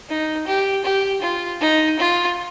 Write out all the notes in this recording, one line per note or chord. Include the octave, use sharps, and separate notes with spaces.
D#4
G4
G4
F4
D#4
F4